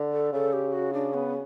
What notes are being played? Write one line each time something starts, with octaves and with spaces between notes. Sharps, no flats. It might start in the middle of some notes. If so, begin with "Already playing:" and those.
Already playing: D3
A4
C#3 A4
G4
F#4
D4
B3